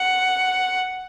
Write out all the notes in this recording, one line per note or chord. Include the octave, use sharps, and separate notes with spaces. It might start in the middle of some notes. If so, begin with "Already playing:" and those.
Already playing: F#5